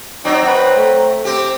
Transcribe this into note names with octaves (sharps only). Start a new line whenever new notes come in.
F#3 C4 D#4
B4
A3
C4 G4